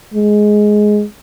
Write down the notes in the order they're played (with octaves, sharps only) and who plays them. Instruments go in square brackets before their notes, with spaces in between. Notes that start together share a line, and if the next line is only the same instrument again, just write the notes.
[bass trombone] G#3